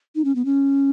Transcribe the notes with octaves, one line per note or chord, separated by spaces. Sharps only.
D#4
C#4
B3
C#4